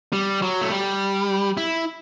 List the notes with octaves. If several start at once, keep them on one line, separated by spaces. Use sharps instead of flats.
G3
F#3
A3
G3
E4